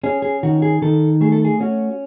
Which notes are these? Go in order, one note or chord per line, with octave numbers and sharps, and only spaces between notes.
C#4 G#4
G#4
D#3 F#4
G#4
D#3 A4
A3 G#4
A4
G#4
C#4 F#4